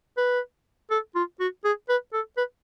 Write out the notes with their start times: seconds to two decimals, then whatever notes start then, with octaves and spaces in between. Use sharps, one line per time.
0.17 B4
0.91 A4
1.15 F4
1.40 F#4
1.64 G#4
1.89 B4
2.13 A4
2.38 B4